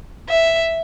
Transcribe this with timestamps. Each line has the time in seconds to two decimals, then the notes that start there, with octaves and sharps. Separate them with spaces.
0.29 E5